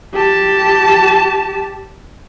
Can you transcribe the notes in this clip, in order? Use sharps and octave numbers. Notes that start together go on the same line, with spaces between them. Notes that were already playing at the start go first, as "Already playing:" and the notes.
G4 A5